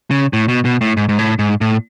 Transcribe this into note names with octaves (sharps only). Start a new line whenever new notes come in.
C#3
A2
B2
B2
A2
G#2
G#2
A2
G#2
A2